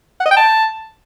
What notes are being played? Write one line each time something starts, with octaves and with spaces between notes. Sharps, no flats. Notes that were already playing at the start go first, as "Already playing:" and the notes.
F#5
D#5
G5
A5